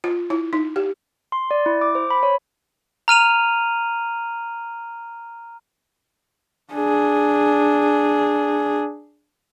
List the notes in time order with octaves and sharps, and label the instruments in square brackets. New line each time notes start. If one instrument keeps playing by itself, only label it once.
[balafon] F4
E4
D#4
G4
[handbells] C6
D5
E4
D6
C5
B5
C#5
[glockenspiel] A#5 F6 D#7 F7
[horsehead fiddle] D4 G#4